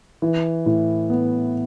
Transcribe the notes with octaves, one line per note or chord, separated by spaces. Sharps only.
E3
A2
B3